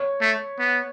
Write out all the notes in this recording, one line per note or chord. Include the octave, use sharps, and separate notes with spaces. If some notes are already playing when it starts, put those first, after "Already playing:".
Already playing: C#5
A3
B3